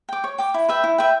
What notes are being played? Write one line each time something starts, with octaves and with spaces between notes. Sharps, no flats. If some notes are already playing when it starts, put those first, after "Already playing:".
G5 D6
C#5
G5 D6
E4
B4 E5 G5
E4
B4 E5 G5